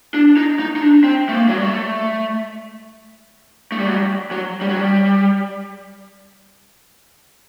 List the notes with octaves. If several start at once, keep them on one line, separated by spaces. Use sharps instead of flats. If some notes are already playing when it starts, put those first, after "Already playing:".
D4
D#4
D#4
D#4
D4
C4
A3
A#3
F#3
G3
A3
A3
G3
F#3
G3
F#3
G3
F#3
G3